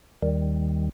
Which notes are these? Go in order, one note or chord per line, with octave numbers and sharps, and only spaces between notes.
D#2 D#3 G3